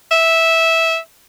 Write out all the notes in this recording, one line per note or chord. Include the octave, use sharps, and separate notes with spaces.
E5